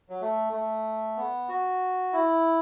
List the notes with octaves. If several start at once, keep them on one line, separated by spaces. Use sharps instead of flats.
F#3
A3
A3
B3
F#4
E4